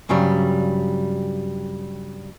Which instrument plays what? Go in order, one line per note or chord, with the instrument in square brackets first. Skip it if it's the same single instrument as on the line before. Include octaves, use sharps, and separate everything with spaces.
[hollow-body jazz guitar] G2 C#3 F#3 G3